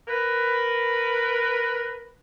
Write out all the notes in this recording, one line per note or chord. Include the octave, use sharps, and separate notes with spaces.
A#4 B4